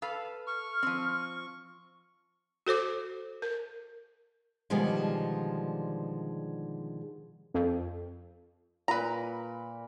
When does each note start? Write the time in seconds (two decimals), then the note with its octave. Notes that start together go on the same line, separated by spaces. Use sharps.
0.02 A4 B4 F5
0.47 C#6 F6
0.83 F3 C4
2.67 F#4 A4 C5 D6
3.42 A#4
4.70 B2 D3 D#3 F3 G3 G#3
7.54 F2
8.88 A#2 B4 A#5 B5